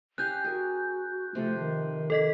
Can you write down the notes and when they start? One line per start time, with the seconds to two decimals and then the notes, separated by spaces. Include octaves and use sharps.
0.18 C#4 G4 F5 F#6 G6
0.44 F#4 G#4 A#4
1.35 C3 F3 A3 A4
1.58 D#3
2.10 A4 D#5 B6